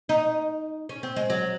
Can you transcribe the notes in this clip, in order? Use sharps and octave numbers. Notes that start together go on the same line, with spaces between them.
D#4
C#4
C4
G#3
F#3